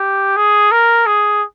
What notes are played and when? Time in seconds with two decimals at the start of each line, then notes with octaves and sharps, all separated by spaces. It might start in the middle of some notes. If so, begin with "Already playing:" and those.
Already playing: G4
0.36 G#4
0.71 A#4
1.06 G#4